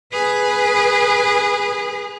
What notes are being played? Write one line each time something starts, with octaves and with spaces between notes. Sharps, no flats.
G#4 B4